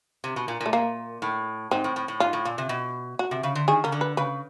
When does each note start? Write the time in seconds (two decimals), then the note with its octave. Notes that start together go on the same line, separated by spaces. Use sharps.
0.24 C3
0.36 B2
0.48 A#2
0.61 A#2
0.66 A3
0.73 A#2 A#3
1.22 A2
1.71 G#2 C4
1.84 A2
1.96 A2
2.08 A2
2.20 G#2 F4
2.33 A2
2.45 A#2
2.58 C3
2.69 B2
3.19 F#4
3.31 C3
3.43 C#3
3.55 D3
3.68 D#3 G#4
3.84 C#3 A#4
3.92 D3
4.01 B4
4.17 C#3 B4